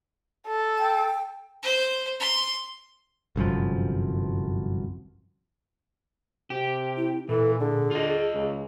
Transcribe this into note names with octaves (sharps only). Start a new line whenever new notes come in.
A4
G5
C5
C6
G1 C2 F#2 F3
C3 G4
E4
A#2 E3 A4
D3 G#4
F4 D#5
C#2